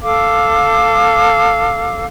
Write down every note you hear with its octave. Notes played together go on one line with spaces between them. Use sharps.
A4 F5 D6